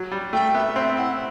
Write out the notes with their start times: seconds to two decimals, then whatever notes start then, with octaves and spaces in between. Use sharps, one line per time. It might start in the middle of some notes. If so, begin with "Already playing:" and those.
Already playing: F#3
0.12 G3
0.33 A3 G5
0.54 B3 E5
0.76 C4 E5
0.97 E4 F#5